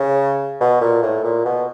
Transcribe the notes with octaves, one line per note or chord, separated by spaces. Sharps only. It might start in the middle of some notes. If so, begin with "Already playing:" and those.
Already playing: C#3
B2
A#2
A2
A#2
B2